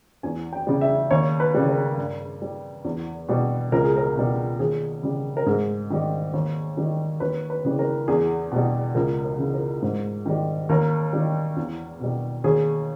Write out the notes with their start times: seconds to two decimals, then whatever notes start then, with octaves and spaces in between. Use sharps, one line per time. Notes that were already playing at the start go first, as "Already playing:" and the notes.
0.23 E2 G#5
0.53 G5
0.67 C#3 G3
0.81 E5
1.11 D#2 C#5
1.40 B4
1.54 C#3 G3
1.69 A#4
1.98 G2
2.42 G3
2.85 E2
3.29 B2 G3
3.72 C#2 A#4
3.84 G#4
3.97 A#4
4.16 B2 G3
4.59 D#2 G#4
5.03 C#3 G3
5.37 A#4
5.46 G#2 G#4
5.90 D#3 G3
6.33 D#2
6.77 D#3 G3
7.20 D#2 B4
7.50 B4
7.65 C#3 E3 G3
7.79 A#4
8.08 E2 G#4
8.52 B2 G3
8.95 C#2 A#4
9.24 A#4
9.39 C#3 E3
9.54 A#4
9.82 G#2
10.26 D#3 G3
10.69 D#2 A#4
11.13 D#3 G3
11.57 E2
12.00 B2 G3
12.44 D#2 G#4